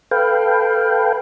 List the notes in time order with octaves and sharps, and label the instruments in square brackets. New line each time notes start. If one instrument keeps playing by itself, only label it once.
[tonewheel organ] A4 B4 F5 G5